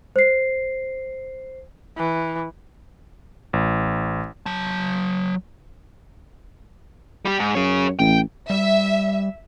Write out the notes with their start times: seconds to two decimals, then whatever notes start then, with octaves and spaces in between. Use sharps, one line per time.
0.16 C5 C7
1.98 E3
3.53 A1
4.46 F#3 A5
7.25 G3 G4
7.39 G#2
7.55 F#2 G#4 C#5
7.99 A1 G5
8.50 G3 E5